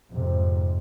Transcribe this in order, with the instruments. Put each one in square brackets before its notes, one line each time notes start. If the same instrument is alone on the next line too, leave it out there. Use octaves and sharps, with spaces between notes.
[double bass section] F2 G#2 C3